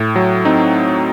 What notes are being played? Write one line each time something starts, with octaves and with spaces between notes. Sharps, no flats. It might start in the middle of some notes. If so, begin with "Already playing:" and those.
Already playing: A2
F#3
C4 D#4